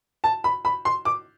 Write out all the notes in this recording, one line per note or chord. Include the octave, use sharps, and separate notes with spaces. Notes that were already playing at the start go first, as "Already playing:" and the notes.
A5
B5
B5
C6
D6